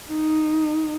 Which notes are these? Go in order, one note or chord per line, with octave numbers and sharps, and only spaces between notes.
D#4